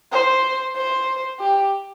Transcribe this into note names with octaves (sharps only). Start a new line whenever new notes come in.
C5
C5
G4